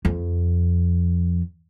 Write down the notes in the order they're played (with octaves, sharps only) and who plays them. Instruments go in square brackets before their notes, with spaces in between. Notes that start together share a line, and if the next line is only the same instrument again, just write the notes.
[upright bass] F2